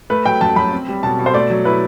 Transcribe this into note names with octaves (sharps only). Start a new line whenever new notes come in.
A3 B4
F#3 G5
F#2 A5
F#2 B5
C4
G3
B2 A5
B2
C5
A3 D5
F#3
E4 B4